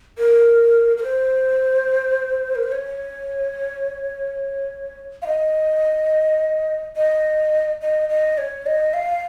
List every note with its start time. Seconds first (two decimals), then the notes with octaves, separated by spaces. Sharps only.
0.18 A#4
0.97 A#4
1.04 C5
2.55 A#4
2.63 C5
2.72 C#5
5.22 F5
5.27 D#5
6.96 D#5
7.81 D#5
8.09 D#5
8.38 C#5
8.66 D#5
8.94 F5